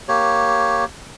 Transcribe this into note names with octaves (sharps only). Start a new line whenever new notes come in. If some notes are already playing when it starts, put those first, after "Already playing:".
A#3 G4 C#5